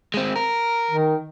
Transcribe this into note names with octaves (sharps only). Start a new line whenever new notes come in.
G#3 C4
A#4
D#3